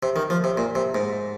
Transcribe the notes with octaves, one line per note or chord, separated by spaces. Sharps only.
C3
D#3
F3
C3
A#2
C3
G#2